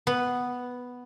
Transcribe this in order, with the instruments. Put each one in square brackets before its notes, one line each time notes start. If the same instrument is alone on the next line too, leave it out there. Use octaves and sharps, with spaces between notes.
[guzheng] B3